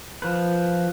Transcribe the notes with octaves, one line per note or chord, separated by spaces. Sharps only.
F3 B4